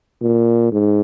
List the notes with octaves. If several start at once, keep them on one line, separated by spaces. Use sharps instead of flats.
A#2
G#2